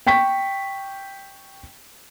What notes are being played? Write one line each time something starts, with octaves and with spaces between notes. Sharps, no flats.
G5 C#6 B6